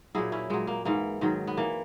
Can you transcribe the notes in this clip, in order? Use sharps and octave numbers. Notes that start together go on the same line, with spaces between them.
A#2 F#3 E4 G#4
C#4 E4
A#2 F#3 G#3
A#3
G#2 E3 A#3
G#2 D#3 F#3
B3
E3 A#3